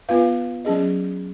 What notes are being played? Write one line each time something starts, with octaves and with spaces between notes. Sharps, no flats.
B3 F4 B4 F5
F#3 C#4 G#4 D#5